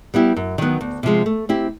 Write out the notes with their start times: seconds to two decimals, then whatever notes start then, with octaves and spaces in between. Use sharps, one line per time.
0.14 G3 B3 E4 G4
0.36 F#2
0.58 D#3 F#3 B3
0.81 D2
1.03 C3 F3 G#3
1.26 A3
1.49 C4 E4 G4